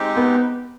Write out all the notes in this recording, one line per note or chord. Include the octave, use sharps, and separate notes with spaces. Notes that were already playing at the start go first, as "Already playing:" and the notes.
Already playing: G#3 C4 D#4 G4
B3